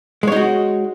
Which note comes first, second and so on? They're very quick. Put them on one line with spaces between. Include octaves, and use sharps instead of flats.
G#3 C#5 D#4 F#4